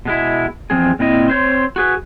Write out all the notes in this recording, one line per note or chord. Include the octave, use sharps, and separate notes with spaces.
B2 G#3 E4
E2 C#3 F3 C4 G#4
A#2 C4 E4 D#5
C4 C5 C#5
F#4 G#4 B4